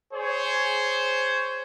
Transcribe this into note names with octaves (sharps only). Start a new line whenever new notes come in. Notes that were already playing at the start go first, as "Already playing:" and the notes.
G#4 C5 C#5